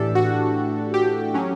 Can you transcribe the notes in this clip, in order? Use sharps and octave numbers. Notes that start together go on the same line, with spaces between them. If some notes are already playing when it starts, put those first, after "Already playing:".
Already playing: A2 E3 A3 D4 G4 A4
F#4
G4
F#3 C#4